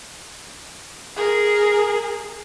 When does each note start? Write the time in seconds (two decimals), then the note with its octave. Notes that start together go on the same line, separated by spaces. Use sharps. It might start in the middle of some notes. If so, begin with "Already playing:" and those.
1.16 G#4 A#4